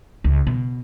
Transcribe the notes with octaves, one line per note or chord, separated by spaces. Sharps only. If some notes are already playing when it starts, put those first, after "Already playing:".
C#2
B2